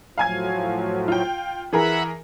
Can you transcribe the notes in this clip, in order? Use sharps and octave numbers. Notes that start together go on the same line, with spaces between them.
A2 F3 F#3 F5 G#5 G#6
F4 G5
E3 G#4 A#4 E5 F#5 B5